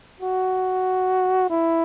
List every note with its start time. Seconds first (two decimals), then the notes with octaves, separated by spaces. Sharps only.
0.20 F#4
1.50 E4